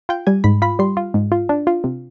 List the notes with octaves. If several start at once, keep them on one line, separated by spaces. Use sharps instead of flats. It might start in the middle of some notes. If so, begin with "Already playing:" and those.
F4 G5
G3 G#5
G#2 B5
F4 B5
G3 C6
F4
G#2
F4
D4
F4
C3